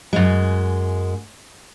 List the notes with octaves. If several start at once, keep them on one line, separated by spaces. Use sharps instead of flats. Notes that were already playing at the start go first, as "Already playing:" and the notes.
F#2 G#3